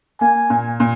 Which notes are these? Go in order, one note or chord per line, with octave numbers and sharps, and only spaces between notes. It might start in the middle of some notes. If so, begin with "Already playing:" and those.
A#3 G#5
A#2
A#2